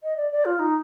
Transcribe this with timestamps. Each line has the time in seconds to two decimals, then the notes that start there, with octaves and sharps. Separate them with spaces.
0.03 D#5
0.16 D5
0.32 D5
0.45 F4
0.59 D#4